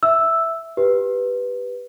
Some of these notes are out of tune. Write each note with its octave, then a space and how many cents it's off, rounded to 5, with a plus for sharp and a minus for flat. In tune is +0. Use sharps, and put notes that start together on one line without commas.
E5 +0 E6 +0
G4 +0 B4 +0